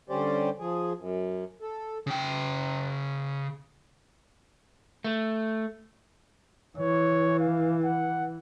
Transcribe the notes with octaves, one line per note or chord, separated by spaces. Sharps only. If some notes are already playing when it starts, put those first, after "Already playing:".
D3 G3 C#4 G4 C5 D5
F3 G#4
F#2
A4
C#3 G5
A3
E3 C#5
F5
F#5